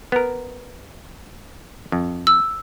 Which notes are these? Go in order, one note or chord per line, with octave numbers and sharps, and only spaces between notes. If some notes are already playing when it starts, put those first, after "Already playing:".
B3 A#4
F2
E6